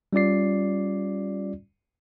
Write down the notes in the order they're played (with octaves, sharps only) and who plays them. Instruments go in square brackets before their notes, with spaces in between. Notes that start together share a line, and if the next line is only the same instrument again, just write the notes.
[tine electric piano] G3 C#4 F4 D5 C7